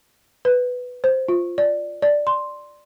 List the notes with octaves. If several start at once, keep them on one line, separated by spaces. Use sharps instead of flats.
B4
C5
F4
D5
D5
C6